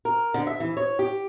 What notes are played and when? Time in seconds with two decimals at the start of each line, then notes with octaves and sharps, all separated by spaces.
0.05 A#4
0.34 D3
0.47 E5
0.60 E3
0.77 C#5
0.99 G4